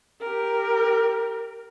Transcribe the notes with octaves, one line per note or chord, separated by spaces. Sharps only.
G4 A#4